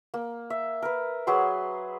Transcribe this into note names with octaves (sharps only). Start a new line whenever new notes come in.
A#3
E5
A#4 B4
F#3 G#4 B4 C6